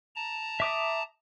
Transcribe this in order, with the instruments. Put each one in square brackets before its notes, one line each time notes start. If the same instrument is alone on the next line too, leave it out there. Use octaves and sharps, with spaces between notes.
[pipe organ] A5 A#5
[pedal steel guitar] E5 D6 D#6